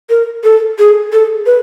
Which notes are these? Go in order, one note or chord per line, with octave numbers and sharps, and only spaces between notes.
A#4
A4
G#4
A4
B4